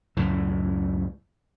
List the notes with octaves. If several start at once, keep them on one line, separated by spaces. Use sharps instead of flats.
C#2 F#2 A2 E3